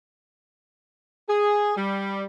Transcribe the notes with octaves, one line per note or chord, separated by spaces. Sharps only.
G#4
G3